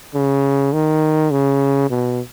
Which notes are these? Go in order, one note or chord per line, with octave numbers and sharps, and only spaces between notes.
C#3
D#3
C#3
B2